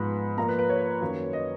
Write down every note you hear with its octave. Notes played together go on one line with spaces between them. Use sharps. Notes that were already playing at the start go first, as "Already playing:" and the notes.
Already playing: G#2 F3 G#3 B3 B5
A#2 F3 A#3 A#5
B4
B4
C#5
F#2 D#3 A#3
D#5